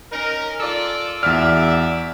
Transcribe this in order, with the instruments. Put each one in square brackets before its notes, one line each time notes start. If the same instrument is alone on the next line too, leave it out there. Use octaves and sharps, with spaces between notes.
[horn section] C#4 D#4 A#4
F4 A4 D5
[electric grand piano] E2 F6 [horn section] F#4 D5 E5